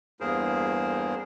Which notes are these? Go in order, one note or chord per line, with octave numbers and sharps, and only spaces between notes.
E2 G2 A#3 G#4 A#4 C5